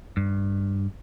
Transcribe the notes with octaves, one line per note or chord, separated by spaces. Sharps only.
G2